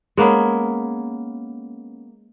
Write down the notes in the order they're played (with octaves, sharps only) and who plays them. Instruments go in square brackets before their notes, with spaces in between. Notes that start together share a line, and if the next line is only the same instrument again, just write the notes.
[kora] G#3 A#3 B3 C#4